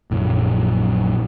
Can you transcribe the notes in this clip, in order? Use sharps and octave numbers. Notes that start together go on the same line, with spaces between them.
A#1 F#2 A#2 F#3